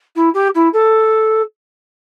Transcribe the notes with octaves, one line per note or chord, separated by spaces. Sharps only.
E4
G4
E4
A4